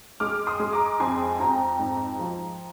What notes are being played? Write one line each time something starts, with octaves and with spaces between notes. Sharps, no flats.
G#3 D6 F6
C6 D#6
G#3
A#5 D6
F2 G#5 C6
F2 G5 A#5
G#2
F3